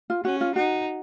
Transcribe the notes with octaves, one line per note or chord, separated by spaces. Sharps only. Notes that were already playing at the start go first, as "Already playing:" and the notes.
F4
C#4 F#4
F4
D#4 F#4